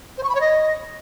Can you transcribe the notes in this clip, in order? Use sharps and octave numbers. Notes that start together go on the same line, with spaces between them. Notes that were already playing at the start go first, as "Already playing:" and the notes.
C5
C#6
B5
C#5
D#5